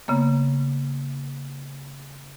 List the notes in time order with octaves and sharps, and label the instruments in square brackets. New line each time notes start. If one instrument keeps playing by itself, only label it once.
[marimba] C#3 A#3 B3